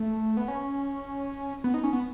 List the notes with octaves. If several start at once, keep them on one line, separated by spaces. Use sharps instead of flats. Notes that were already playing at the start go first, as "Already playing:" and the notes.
Already playing: A3
B3
C#4
B3
D#4
C#4
B3